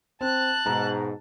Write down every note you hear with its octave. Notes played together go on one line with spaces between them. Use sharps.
C4 A5 F#6
G#2 B2 A#5